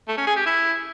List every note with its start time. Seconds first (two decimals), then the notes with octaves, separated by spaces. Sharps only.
0.08 A3
0.18 C#4
0.27 G#4
0.37 G4
0.46 E4